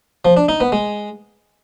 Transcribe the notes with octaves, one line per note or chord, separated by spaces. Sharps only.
F3
D4
D#4
B3
G#3